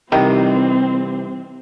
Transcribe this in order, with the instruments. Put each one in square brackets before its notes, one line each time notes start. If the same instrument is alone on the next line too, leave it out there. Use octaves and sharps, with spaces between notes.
[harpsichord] C2 D#6 [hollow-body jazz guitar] C3 E3 [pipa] D#3 [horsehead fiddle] C4